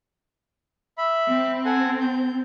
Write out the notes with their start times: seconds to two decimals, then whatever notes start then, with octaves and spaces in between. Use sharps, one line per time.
0.98 E5 B5
1.28 C4
1.65 A4 F#5 G#5
2.01 G6